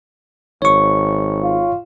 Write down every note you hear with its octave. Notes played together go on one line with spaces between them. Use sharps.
G#1 C#5 C#6
F4